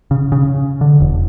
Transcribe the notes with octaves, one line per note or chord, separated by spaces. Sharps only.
C#3
C#3
D3
E1